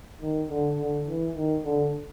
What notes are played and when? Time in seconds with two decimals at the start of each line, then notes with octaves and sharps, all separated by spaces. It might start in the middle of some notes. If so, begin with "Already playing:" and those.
0.21 D#3
0.49 D3
0.78 D3
1.07 E3
1.35 D#3
1.64 D3